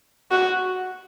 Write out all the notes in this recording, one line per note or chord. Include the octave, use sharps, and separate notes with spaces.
F#4